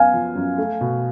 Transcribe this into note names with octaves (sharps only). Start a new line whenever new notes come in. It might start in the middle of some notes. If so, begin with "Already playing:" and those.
Already playing: F#2 B3 F5 G#5
F3
F#2
A3
B2